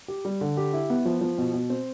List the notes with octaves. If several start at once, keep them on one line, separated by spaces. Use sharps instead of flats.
G4
G3
D3
G4
E4
B3
F3
F3
B2
B2
C4